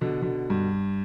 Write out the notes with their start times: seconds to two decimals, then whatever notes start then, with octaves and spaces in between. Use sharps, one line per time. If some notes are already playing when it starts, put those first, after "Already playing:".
0.01 B2 D3
0.22 B2 D3
0.50 G2